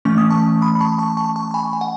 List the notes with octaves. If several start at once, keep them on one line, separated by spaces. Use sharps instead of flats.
E3 A3 C#4 C#6
D#6
A5 C#6
B5 D#6
B5
A5 C#6
A5 C#6
A5 C#6
A5 C#6
C#6
G#5 B5
G#5
F#5